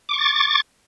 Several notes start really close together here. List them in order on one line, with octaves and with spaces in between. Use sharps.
D6 C#6 A6